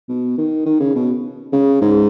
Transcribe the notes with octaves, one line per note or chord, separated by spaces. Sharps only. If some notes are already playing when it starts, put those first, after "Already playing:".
B2
D#3
D#3
C#3
B2
C#3
G#2